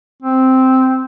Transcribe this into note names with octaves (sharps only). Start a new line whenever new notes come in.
C4